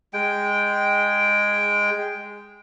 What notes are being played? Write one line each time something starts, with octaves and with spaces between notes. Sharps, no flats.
G#3 G5